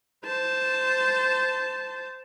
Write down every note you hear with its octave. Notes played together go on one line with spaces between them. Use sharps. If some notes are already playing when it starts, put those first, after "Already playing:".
C5 A5